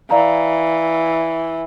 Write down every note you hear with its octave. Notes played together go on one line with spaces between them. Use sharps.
E3 D5 F5 A#5